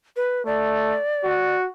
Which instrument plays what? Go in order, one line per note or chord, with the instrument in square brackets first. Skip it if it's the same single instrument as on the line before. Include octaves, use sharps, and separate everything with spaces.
[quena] B4
[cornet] A3 [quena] D5
[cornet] F#4